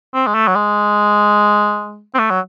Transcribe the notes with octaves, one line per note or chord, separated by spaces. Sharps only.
C4
G#3
A3
F#3
G#3
C4
A3
F#3